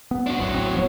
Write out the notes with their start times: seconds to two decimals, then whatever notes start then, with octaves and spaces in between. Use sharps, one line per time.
0.11 B3
0.27 D4 F#4
0.39 G#1 D2 A2 F#3
0.54 C4
0.73 F1 F3 B3